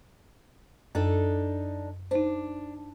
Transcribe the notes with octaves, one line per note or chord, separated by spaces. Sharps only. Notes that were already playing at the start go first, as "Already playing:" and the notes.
F#2 D4 D#4 A4
D4 D#4 C5